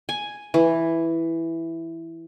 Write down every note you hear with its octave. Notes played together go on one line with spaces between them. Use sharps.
G#5
E3